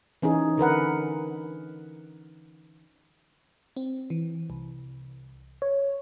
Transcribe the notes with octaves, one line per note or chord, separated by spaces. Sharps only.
E3 C#4 D#4 G#4
D3 A#4 B4 F#5
C4
E3
C2
C#5